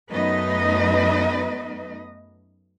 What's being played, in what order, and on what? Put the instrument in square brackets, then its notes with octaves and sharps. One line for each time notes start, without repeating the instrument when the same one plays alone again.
[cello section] F#2 A3 B3 D#4 B4 D#5